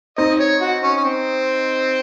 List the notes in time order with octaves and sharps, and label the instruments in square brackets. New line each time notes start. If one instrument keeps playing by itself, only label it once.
[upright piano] C4 D#4 [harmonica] D#5
[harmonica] C#5
F#4
C#4
C#4
C4